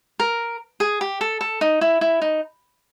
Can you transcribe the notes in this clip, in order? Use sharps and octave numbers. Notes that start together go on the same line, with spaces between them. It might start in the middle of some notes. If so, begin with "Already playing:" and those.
A#4
G#4
G4
A4
A4
D#4
E4
E4
D#4